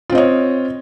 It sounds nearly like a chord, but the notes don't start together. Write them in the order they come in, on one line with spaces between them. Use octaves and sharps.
F4 C4 D#5 C#5